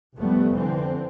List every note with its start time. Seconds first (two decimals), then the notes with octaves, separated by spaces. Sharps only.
0.17 F1 F2 G3 A3 B3
0.56 F2 D3 E3 C4